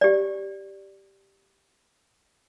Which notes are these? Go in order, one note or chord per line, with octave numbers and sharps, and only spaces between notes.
G4 D5